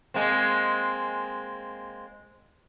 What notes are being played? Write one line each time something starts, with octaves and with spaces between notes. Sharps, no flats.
G#3 A#3 C4